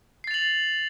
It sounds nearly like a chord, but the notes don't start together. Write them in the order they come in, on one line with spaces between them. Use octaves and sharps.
C7 A6 F7 F#7